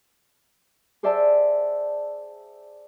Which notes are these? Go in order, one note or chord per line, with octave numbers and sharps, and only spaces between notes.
G#4 C5 D5 E5 G5 A5